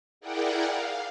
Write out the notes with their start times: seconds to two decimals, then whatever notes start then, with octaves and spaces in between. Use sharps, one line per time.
0.21 E4 G#4 A#4 D5 F#5 G5
0.65 F5